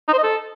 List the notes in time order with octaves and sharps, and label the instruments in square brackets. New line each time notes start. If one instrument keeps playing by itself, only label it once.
[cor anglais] D#4
C5
D#5
A4